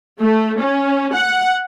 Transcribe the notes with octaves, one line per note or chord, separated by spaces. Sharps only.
A3
C#4
F#5